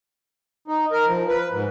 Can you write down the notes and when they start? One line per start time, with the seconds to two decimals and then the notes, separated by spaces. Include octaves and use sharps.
0.68 D#4
0.92 A#4
1.07 F3
1.28 B4
1.51 G#2